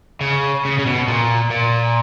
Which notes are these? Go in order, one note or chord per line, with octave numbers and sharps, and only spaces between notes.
C#3
C#3
C#3
B2
A#2
A#2